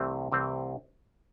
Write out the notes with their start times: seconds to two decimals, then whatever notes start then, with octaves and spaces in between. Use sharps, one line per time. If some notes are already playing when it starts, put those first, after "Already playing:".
Already playing: C2 C3 E3 A3 C4
0.32 C2 C3 E3 A3 C4